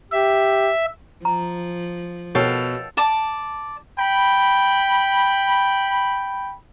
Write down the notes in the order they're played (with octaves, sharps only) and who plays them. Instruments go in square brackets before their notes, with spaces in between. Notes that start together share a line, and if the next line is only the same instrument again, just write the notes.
[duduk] G4 [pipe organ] E5
[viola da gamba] F3 [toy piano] A#5
[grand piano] B2 [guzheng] A4 F5 G5 [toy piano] A#4 C#5
[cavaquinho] D5 A5 D6
[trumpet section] G5 B5